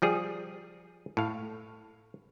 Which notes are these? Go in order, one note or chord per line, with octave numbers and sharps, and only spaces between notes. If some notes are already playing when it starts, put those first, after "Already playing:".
F3 G3 G#4
A2 F5